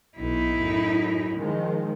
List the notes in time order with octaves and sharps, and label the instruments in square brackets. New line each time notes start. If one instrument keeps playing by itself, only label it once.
[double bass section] B1 [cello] D#4 E4
[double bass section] F#2 A2
D#3 F3 G#3